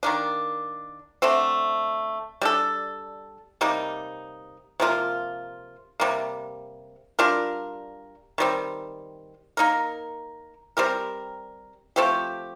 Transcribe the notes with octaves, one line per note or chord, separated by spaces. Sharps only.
D#3 A#3 D4
D3 A3 C4
G3 D4 A4
C3 G3 A#3 D#4
C3 F3 A#3 F4
C3 G3 A#3
G3 D4 F4 A#4
D#3 G3 C4
A#3 D#4 A#4
G3 C4 G4 A#4
F3 A3 C4 G4